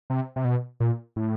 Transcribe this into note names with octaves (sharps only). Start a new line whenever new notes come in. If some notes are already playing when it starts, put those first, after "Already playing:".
C3
C3
B2
A#2
A2